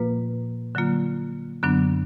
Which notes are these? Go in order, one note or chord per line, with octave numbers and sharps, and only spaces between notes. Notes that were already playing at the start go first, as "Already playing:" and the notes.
Already playing: A#2 F3 A#3 F4 B4
D3 F#3 A#3 F4
F#2 D3 F#3 B3 D4